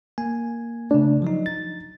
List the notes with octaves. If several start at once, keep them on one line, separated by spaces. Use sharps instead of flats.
A#3 G#5
C#3 A3 D4
F3 F#3 D#4
A6